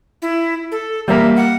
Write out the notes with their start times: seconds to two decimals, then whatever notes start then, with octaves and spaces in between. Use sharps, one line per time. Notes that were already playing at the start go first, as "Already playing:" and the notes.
0.22 E4
0.72 A4
1.08 G3 A#3 E5
1.36 F#5